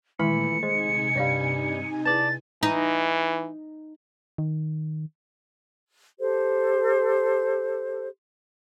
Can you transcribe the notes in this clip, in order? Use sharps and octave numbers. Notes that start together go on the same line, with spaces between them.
A#2 D#3 E3 G#3 A3 E4 B5 C#7
C3 G#3 D#4 C5 G#5
G2 G3 C#5 D5 F5
E4 G#4 B4 D5 A5 A6
E3 D#4
D#3
G4 A4 C5